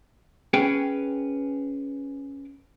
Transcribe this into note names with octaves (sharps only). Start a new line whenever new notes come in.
C#4 G#4 B4 G5